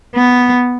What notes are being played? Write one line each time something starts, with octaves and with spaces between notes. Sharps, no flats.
B3